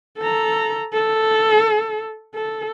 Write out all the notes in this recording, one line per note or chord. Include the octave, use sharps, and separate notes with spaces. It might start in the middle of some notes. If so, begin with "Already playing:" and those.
A4 A#5
A4
A4